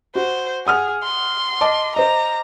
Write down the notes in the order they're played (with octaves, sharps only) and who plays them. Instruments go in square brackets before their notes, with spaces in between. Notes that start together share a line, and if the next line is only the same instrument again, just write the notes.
[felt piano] F#4 [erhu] C5
[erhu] G#4 [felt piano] F#5 D#6 F6
[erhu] C6
[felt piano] D#5 A5 D6
[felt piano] C5 D#5 [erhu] A#5